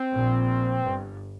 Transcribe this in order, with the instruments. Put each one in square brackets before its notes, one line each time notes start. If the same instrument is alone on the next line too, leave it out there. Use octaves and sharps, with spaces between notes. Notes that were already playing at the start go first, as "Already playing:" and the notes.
Already playing: [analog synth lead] C4
[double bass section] A#1 A#2
G1 G2